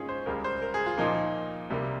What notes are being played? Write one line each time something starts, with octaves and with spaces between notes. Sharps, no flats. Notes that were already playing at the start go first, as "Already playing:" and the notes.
Already playing: G#2 D#3 A#3 C#4 D#4 F4 G#4
C5
C#2 C#3 G3 A#4
C5
A#4
G#4
F4
A#2 F3 A#3 D#4
C2 C3 G3 A#3